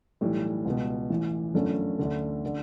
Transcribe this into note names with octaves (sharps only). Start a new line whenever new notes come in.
B1 A2 E3 G3
C#2 B2
A1 A2 E3
G1 F#2 D3 A3 C#4
D2 D3
D3